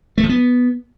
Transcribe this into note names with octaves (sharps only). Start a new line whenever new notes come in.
A3
F3
B3